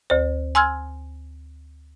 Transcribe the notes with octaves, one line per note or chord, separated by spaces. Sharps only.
D2 C5
G#5 C6 E6 F6 G#6